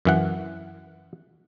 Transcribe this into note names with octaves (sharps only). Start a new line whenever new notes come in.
F#2 E3 F#5